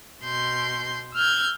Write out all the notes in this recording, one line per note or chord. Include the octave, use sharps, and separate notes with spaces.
B2 C6 G6
E6 F6 G6 G#6